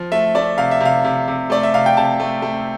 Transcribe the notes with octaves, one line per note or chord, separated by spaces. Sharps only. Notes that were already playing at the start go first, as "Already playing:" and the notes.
Already playing: F3
A3 E5
A3 D5
C3 F5
E5
C3 F5
C3
C3
A3 D5
E5
C3 F5
G5
C3 A5
A3
A3